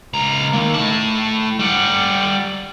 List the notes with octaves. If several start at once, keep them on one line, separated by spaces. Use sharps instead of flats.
C#2 A#5
D#3 A#3
A2 A5
G3 F#5